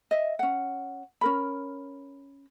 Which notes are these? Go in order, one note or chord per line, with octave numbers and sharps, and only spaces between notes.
D#5 E5
C#4 F#5
C#4 A#4 B5